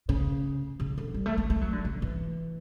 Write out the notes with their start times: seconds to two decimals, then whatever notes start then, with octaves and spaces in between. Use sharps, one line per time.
0.09 C#3
0.80 C#3
0.98 D3
1.14 G3
1.26 A3
1.37 A3
1.50 A3
1.61 F#3
1.72 D3
1.85 C#3
2.02 E3